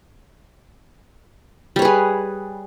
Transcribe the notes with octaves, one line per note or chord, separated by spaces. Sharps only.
G3 G#4 B4 C#5